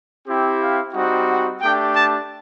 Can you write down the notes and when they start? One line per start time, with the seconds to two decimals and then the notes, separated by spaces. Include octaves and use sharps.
0.26 C4 E4 G4
0.60 F5
0.94 G3 C4 D#4 F#4
1.28 F#5
1.61 A3 D4 G4 G5
1.96 A5